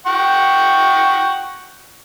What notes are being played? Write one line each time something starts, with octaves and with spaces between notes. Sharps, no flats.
F#5 G5 C#6